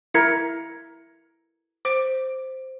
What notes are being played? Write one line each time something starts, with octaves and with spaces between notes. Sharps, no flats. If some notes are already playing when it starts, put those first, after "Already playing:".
E4 A#4 G#6 C#7
C5 D6